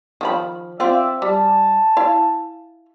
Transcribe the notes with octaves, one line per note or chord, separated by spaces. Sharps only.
D#3 F3 B5
C4 F4 D5 E5
G3 G#5 A5
E4 F5